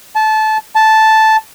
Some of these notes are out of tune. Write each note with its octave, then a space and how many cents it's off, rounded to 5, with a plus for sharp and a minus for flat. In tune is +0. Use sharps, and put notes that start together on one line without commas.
A5 -20
A5 -5